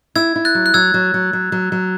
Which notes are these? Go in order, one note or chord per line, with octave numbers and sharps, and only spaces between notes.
E4 E6 G#6
E4
F#6 A6
F#3
F#6
F#3 E6 G#6
F#3
F#3
F#3
F#3
F#3